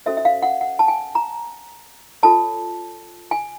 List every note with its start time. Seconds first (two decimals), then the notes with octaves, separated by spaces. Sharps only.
0.06 C#4 F#4 A4 C5 E5
0.17 E5
0.25 F5
0.43 F#5
0.61 F#5
0.79 A5
0.88 G#5
1.15 A#5
2.23 F4 A4 C#5 A5
3.31 G#5